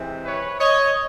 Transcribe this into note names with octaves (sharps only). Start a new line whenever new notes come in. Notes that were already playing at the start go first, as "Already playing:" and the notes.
Already playing: C3 E3 G#3 C4
B4 C#5
C#5 D#5